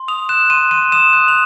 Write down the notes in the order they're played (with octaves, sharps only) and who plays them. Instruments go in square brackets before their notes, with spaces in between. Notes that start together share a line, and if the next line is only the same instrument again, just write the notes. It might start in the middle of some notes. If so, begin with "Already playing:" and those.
Already playing: [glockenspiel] C6
D#6 F7
F#6 E7
C6 D#7
C6 D#7
D#6 E7
F#6
F7